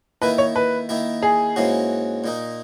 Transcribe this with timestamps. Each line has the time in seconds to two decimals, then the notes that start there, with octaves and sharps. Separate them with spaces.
0.22 D#3 A#3 E4 B4
0.38 C#5
0.56 B4
0.89 D#3 A#3 E4
1.22 G#4
1.56 G#2 E3 A#3 C#4 F#4
2.24 A#2 A#3 D#4